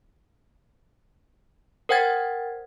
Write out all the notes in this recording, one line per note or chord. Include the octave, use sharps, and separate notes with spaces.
A#4 C5 F#5 G5 G#6 A6